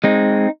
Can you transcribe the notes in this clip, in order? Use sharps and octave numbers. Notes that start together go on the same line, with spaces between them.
G#3 C4 D#4